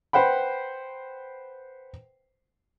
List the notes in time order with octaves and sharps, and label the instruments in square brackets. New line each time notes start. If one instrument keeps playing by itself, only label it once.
[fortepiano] B4 C5 F#5 G5 B5